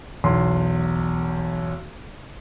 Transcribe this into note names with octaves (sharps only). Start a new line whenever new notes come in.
B1 E2 C6